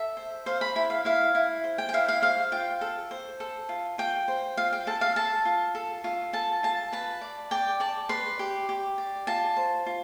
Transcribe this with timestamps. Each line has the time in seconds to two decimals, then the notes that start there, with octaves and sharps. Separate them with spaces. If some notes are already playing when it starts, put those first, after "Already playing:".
Already playing: A4 E5
0.17 C5
0.46 C5 F5
0.61 B5
0.76 E4 B5
0.90 F5
1.05 E4 F5
1.35 E4
1.64 C5
1.78 G5
1.89 G5
1.93 E4 F5
2.08 F5
2.22 C5 F5
2.52 F4 G5
2.81 A4
3.11 C5
3.40 A4
3.69 F4
3.98 F4 G5
4.28 C5
4.57 F4 F5
4.73 G5
4.87 A4 A5
5.01 F5
5.16 A4 A5
5.45 F4
5.75 A4
6.04 F4
6.33 A4 A5
6.63 F4 A5
6.92 B4 A5
7.21 D5
7.51 D5 G5
7.80 D5 A5
8.09 B4 C6
8.39 G4
8.69 G4
8.98 D5
9.27 F4 A5
9.57 C5
9.86 F4